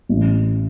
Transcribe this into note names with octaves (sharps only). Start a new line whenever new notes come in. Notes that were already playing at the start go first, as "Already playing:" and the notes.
A1